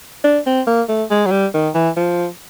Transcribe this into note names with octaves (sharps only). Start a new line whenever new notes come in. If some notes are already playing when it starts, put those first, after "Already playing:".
D4
C4
A#3
A3
G#3
F#3
G3
D#3
E3
F3